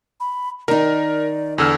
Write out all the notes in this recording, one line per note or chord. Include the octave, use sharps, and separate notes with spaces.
B5
D#3 D#4 A#4 D5 A#5
E2 D3 E6 F6